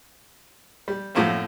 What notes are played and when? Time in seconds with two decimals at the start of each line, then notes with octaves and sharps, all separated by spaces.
0.88 G3
1.15 F#2 A2 F3 A3 A#3 C4